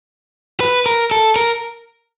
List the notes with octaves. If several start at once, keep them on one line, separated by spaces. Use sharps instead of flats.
B4
A#4
A4
A#4